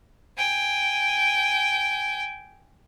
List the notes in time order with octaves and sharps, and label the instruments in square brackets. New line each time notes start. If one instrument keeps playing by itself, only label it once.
[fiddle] G5 G#5